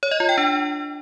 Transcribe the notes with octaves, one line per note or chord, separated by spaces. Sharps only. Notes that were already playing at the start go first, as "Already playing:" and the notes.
C#5
D#5
F4
G5
D4